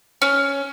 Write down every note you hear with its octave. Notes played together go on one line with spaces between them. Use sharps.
C#4